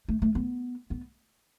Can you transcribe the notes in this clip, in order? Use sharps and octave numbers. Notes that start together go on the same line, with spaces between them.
A3
A3
B3
B3